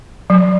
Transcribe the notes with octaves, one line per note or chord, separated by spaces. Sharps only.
F#3